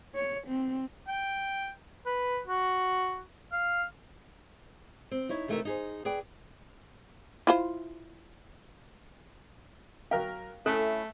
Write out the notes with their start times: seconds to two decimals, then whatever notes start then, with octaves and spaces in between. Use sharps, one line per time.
0.15 C#5
0.47 C4
1.08 G5
2.06 B4
2.48 F#4
3.53 F5
5.11 C4
5.29 D#4 E4 C#5
5.48 C3 E3 A3 D#4 A#4 E5
5.65 D#4 G#4 C5
6.05 G#4 B4 D5 G5
7.47 E4 F4 C5
10.11 F#3 A#4 F5 G5
10.66 A3 C#4 E4 A4 F#6